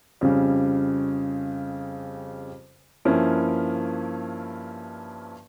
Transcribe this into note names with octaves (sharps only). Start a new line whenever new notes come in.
F2 C#3 G3 C#4
G2 F3 A#3 C#4 E4